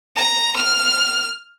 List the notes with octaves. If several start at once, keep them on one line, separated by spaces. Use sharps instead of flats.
A#5
F6